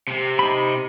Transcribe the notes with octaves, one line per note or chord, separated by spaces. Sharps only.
C3
D#4 B5